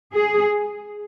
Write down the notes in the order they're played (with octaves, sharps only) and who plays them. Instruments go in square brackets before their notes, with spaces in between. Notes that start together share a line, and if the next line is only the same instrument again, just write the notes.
[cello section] G#4